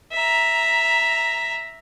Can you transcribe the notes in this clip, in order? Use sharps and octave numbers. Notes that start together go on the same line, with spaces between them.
E5 A#5